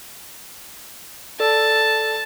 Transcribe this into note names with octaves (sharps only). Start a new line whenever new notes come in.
A4 D5 A5 E6